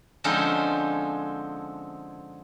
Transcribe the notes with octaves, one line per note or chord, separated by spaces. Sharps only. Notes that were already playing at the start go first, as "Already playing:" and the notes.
D3 F3 G#3 C4 C#4 D#4